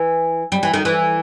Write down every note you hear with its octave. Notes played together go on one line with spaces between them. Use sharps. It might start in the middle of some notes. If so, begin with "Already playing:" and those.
Already playing: E3
G3
E3
D#3
E3